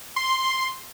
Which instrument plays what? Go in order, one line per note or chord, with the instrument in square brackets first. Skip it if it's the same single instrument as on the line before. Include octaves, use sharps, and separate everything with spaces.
[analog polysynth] C6